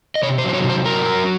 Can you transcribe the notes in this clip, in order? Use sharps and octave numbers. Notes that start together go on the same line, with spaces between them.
D#5
C3 C#5
C5
F#3
C5
C#5
C3
C5
F#3 A#4
F#3